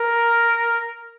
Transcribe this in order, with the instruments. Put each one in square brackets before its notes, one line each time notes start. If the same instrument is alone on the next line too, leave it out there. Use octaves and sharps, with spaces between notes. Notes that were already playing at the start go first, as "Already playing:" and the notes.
Already playing: [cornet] A#4